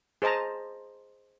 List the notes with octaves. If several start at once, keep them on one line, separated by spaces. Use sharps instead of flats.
G#4 C5 D#5 A5 A#5